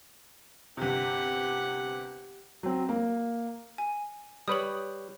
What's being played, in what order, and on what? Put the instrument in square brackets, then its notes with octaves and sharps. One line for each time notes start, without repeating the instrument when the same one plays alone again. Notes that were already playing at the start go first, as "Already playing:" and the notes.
[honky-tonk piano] G1 C3 [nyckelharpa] G4 F#5
[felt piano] F#3 C4
A#3
[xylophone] G#5
[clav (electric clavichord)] G3 B4 C#5 [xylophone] D#6 F#7